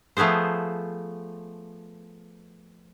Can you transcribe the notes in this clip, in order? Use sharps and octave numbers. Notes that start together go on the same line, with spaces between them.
F3 A3 B3 G#4 C5